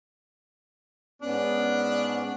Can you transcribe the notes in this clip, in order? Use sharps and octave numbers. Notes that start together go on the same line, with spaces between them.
G#2 B3 C#4 D4